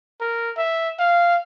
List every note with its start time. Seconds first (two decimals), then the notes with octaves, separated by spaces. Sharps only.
0.20 A#4
0.57 E5
0.99 F5